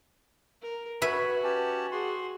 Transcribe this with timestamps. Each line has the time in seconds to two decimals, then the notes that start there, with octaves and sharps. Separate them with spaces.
0.62 A#4
1.02 F#4 B4 C#5 E5
1.43 C#4 G4 A5
1.92 F#4 G#4 C6